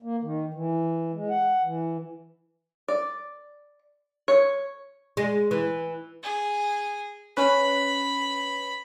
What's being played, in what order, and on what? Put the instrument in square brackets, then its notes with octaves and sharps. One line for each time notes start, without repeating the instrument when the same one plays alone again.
[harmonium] A#3
D#3
E3
G#3
F#5
E3
[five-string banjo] D5
C#5
[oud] G#3
E3
[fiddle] G#4
[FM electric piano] C#4 B4 [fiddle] B5